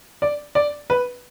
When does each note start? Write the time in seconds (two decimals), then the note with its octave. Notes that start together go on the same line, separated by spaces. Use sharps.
0.22 D5
0.55 D5
0.90 B4